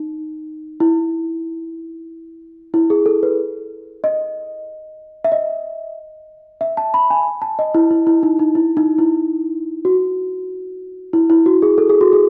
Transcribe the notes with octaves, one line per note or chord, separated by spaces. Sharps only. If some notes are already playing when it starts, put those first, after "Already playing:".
Already playing: D#4
E4
E4
G#4
A4
B4
D#5
E5
D#5
E5
A5
B5
G#5
A5
D#5
E4
E4
E4
D#4
D#4
E4
D#4
E4
F#4
E4
E4
F#4
G#4
A4
G#4
F#4
G#4